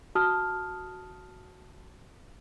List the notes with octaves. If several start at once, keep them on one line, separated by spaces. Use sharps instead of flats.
F#4 A5 D#6 F6